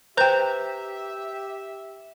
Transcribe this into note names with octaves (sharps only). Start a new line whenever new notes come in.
G4 B4 C5 E5 G5 A#5 G6